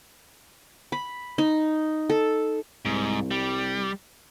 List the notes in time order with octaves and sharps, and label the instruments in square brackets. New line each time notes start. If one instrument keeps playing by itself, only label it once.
[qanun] B5
D#4
A4
[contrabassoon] C2 [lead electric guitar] G#2
[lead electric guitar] G3